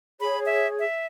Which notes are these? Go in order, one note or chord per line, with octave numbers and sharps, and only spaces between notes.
G#4 C#5 B5
E5
E5